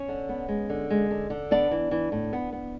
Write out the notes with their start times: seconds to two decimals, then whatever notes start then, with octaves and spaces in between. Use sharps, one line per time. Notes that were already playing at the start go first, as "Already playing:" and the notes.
Already playing: C#4 C#5
0.08 D3
0.29 B3
0.48 G#3
0.70 D3
0.90 G#3
1.11 D3
1.30 D3
1.51 B3 D4 D5
1.71 E3
1.91 E3
2.12 A2
2.33 B3
2.53 B3